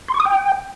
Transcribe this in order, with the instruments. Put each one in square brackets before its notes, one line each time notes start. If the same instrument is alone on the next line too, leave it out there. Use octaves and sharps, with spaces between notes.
[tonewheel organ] C6
C#6
D#6
G5